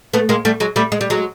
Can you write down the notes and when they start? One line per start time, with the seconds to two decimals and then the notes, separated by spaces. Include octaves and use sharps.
0.13 A3 B3
0.29 G#3 A#3
0.45 G3 A3
0.60 F#3 G#3
0.76 G3 A3
0.92 G#3
1.01 G3
1.10 F#3 G#3